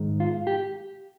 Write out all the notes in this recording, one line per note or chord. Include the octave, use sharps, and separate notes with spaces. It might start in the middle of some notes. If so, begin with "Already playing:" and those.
Already playing: G#2 D#3 G#3
F4
G4